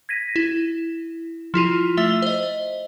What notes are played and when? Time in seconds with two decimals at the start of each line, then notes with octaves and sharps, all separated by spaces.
0.09 G#6 A#6 B6 D#7
0.36 E4
1.54 F3 E4 F4 D#7
1.97 A3 E5 B6 F7 G7
2.22 C5 D#5